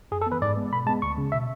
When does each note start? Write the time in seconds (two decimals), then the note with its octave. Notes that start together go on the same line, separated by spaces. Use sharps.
0.11 F#2 G#4
0.21 A4
0.27 B3
0.32 E3 B4
0.42 G#2 D5
0.57 G#3 B3
0.72 B2 B5
0.87 G#3 B3 A5
1.02 D2 C#6
1.17 C#3 G#3
1.32 B2 E5